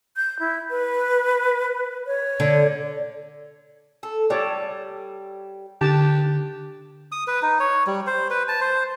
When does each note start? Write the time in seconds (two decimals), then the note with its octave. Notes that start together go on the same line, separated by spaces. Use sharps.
0.17 G6
0.39 E4
0.70 B4
2.06 C#5
2.40 D3
4.03 A4
4.30 G3 A4 C#5 D5
5.81 D3 G4 A5
7.12 D#6
7.27 B4
7.42 D#4
7.60 C#5
7.87 G3
8.07 C5
8.30 B4
8.48 A5
8.61 C5